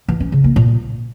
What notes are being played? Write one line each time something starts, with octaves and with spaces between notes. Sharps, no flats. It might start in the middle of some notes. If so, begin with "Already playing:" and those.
E3
C#4
C#3
A#3
A#2